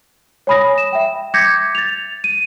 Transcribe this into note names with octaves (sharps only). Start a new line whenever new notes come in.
C#5 G#5 B5 D#6 A#6
E7
E5 G5
D6 G6 G#6 A#6 B6 C#7
A6 F7
D#7